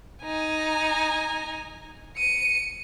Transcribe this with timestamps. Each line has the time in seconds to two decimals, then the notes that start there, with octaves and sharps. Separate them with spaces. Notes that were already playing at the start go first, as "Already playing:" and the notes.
0.24 D#4 G#5
2.17 C#7 D#7